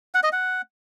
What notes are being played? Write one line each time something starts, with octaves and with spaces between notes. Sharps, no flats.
F#5
D#5
F#5